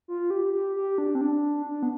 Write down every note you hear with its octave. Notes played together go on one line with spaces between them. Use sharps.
F4
G4
G4
G4
D4
C4
D4
D4
B3